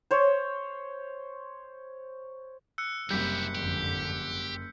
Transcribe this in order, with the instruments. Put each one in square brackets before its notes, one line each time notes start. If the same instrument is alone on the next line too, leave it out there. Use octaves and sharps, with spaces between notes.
[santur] C5 C#5
[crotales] E6 F#6 C#7
[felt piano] F#1 G3 [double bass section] C3 [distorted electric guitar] E4 G4 [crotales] G6 B6
[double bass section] G#1 F2 D3 [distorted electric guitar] G4